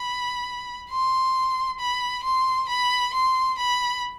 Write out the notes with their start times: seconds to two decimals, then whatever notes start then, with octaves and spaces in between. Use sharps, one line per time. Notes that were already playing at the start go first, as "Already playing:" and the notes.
Already playing: B5
0.90 C6
1.80 B5
2.24 C6
2.69 B5
3.14 C6
3.58 B5